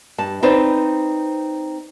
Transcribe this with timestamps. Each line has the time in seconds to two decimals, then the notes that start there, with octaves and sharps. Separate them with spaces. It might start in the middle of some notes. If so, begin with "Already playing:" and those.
0.18 G2 A5
0.43 C4 D#4 B4 C5 D5